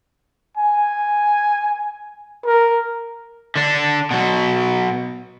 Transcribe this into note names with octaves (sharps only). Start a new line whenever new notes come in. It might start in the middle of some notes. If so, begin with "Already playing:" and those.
G#5
A#4
D3 D4
B2 F#3